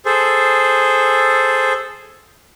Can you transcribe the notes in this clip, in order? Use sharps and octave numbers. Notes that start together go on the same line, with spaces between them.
G#4 A4 C5